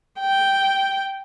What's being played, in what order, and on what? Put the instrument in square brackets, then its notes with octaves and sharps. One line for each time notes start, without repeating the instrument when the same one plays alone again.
[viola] G5